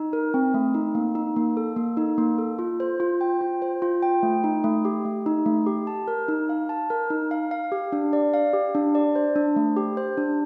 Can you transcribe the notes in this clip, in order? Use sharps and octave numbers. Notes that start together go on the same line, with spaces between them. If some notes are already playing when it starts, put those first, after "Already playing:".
Already playing: D#4
A#4
C4
A3
D#4
A#3
D#4
A#3
A4
A#3
D#4
A#3
A4
F4
C5
F4
G5
F4
C5
F4
G5
A3
D#4
A3
G4
A3
D#4
A3
G4
A5
A#4
D#4
F5
A5
A#4
D#4
F5
F5
G4
D4
D5
F5
G4
D4
D5
C5
D4
A3
G4
C5
D4